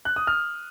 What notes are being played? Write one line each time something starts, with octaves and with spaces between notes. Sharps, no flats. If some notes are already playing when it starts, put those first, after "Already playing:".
F#6
D#6
F6